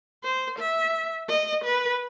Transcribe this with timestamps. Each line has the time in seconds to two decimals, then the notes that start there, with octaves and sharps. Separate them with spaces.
0.23 C5
0.58 E5
1.29 D#5
1.64 B4